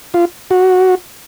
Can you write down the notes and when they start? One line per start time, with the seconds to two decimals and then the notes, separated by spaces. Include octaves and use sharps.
0.14 F4
0.51 F#4